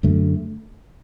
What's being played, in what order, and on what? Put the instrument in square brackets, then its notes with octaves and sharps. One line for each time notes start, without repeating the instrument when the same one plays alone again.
[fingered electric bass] F#2 D3 A3